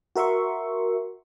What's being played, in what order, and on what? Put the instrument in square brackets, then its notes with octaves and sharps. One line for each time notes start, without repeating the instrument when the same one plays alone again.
[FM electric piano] F#4 A#4 E5 C6 C#6